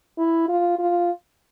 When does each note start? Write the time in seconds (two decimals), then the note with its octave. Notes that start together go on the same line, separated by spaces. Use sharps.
0.18 E4
0.49 F4
0.79 F4